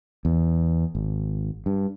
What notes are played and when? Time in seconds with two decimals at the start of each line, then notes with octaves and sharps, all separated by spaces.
0.25 E2
0.95 G#1
1.66 G2